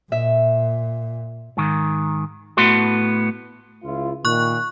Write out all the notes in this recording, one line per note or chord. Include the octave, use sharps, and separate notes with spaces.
A#2 E5
G#2 D#3
A2 A3 B3 F#4 C6
C#2 E4 F4
A#2 D#3 C#6 F#6